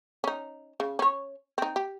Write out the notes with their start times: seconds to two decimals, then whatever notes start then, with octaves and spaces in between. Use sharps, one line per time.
0.24 C#4 D#4
0.80 C#3
0.99 C#4 C#5
1.58 C4 D#4
1.76 G4